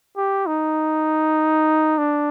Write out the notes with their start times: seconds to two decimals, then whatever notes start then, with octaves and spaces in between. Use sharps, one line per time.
0.17 G4
0.46 D#4
1.98 D4